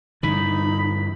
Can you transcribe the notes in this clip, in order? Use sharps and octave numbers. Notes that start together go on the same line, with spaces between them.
G2 D3 E3 D#4 B5